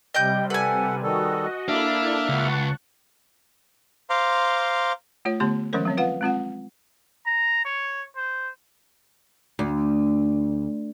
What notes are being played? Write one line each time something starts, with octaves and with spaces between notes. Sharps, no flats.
C3 G3 D#5 G5 G6
A4 B4 F#5 G#5
D#3 G3 F#4 A4 D#5
A#3 D4 E4 A4 E5 F6
C#2 F#5 A5 C#6
C5 F5 A#5 C6 D6
A3 F4 C#5
D3 A3 B3 G4 C6
D#3 F3 G#3 C#4 A#4 C5
F#3 C4 C#5
F4 B4 F5 F#5
G#3 C4 F4 F#5
A#5
C#5
C5
D2